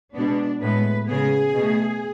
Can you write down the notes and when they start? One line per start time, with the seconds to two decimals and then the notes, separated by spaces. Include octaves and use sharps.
0.14 B2 G#3 B3 D4
0.60 A2 G#3 B3 B4
1.07 C#3 G#3 B3 G#4
1.54 B2 A3